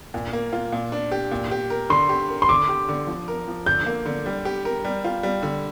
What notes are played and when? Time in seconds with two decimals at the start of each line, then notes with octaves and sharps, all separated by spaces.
0.14 A#2
0.33 A#3
0.53 F4
0.72 A#2
0.92 D4
1.12 G4
1.31 A#2
1.51 G4
1.70 A#4
1.90 D3 C6
2.09 G4
2.29 A#4
2.42 C6
2.49 D3 D6
2.69 G4
2.88 D3
3.07 F3
3.28 A#4
3.48 F3
3.66 D3 G6
3.86 A#3
4.06 D3
4.26 G3
4.45 G4
4.65 A#4
4.85 G3
5.04 F4
5.23 G3
5.43 D3